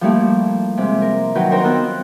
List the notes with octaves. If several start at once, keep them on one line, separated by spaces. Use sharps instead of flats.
F3 G3 A3 A#3 E4 G4
C3 G#3
A#4
D#3 F#3 B4 G5 G6
D#4 A#4 C5 G5 A#5
B3 F4 C5 E6 F#6